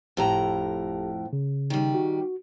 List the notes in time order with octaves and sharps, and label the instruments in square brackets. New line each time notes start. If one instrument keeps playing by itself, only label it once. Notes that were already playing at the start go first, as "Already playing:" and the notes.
[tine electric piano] G1 G4 A5 [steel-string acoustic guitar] F2 A2 A#5
[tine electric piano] C#3
[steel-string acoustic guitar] D#3 G3
[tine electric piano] F#4